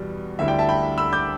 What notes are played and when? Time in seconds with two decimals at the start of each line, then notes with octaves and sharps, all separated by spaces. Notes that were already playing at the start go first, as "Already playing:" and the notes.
Already playing: E2 B2 G3
0.39 D2 D3 G3 E4 E5
0.48 D5 G5
0.59 E5 A5
0.69 G5 B5
0.98 B5 E6
1.13 D6 G6